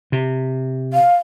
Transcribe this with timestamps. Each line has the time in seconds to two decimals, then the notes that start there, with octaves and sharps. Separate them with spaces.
0.12 C3
0.93 F5